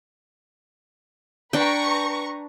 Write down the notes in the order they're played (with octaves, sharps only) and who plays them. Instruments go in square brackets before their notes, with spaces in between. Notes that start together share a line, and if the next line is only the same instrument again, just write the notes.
[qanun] D4 G5 [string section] B4 A#5 C#6